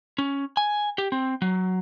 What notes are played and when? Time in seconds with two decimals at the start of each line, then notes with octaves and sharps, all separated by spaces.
0.18 C#4
0.57 G#5
0.98 G4
1.12 C4
1.42 F#3